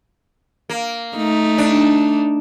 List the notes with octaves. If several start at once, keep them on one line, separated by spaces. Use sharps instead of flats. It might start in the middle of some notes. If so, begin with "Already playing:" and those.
A#3
A3 D#4
D4